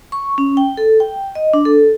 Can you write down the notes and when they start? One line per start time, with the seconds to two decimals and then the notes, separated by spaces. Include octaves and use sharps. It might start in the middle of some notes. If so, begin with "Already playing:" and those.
0.12 C#6
0.38 C#4
0.57 G5
0.77 A4
1.00 G5
1.35 D#5
1.53 D4
1.65 A4